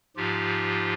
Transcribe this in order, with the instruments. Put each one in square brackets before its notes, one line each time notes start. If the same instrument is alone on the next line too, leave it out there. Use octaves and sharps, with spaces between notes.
[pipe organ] G#2 F3 F4 G4